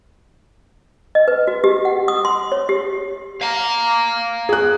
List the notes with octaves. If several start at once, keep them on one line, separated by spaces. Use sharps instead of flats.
D#5
B4
F#4
G4
F#5
D#6
C6
C#5
G4
F5 A#5
G#4 F#6